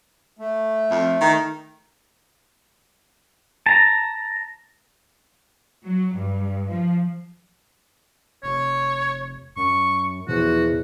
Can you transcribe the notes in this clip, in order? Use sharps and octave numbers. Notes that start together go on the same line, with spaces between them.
A3
F2
D#3
A5 A#5
F#3
G2
F3
F1 C#5
F#2 C#6
E2 B2 F3 F#4